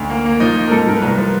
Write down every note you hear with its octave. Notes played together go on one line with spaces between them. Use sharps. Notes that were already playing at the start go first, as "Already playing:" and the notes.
Already playing: D2 D#4
A#3
A#3
F3 D#4
A#3
A#4
G#2 A4
G#2 A#4
B4
C2 A#4
F3 B4